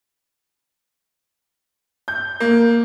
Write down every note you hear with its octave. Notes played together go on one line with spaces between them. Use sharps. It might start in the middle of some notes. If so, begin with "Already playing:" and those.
G6
A#3